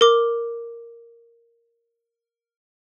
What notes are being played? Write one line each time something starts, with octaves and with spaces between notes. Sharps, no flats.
A#4 D6